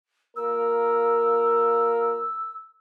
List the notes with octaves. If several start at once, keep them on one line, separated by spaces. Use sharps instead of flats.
A#3 F4 A#4 E6